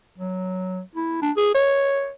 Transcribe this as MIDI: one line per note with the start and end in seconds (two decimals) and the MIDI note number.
0.18 0.81 54
0.95 1.22 64
1.22 1.32 62
1.37 1.50 68
1.55 2.11 73